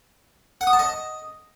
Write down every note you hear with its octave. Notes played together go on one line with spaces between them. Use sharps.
F#5
D#6
A5
D#5